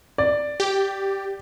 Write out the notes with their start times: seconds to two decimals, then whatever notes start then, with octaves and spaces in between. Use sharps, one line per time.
0.18 D5
0.60 G4